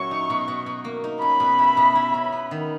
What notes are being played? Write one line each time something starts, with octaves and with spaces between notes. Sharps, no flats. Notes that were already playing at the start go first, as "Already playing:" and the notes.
Already playing: A#2 F#3 C#4 E4 C#6
D#4
B2
B2
B2
A#3
D#4
C#4 B5
B2
E4
B2
E4
C#4
B3
D#3